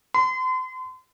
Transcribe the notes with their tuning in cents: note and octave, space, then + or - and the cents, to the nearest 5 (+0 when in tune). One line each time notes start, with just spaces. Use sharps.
C6 -40